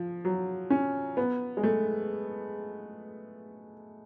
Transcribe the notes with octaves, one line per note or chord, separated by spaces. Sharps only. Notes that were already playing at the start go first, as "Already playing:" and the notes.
Already playing: F3
F#3
C#4
B3
G#3
A3